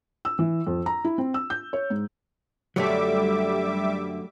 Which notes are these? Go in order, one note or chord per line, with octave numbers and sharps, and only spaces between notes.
E6
E3
F2
A#5
E4
C4
E6
G6
C#5
G#2
F#2 D3 F#3 G3 A3 D5 E5 D6